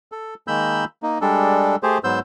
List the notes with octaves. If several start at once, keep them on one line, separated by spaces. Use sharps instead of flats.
A4
D#3 G#3 A#3 B5 E6 G6
A#3 D#4
G3 G#3 D4 A4
A3 G4 G#4 C5
G#2 F#3 B3 C5 E6 G6